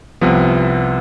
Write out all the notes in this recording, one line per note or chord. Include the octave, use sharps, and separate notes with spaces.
C2 C3 F3 B3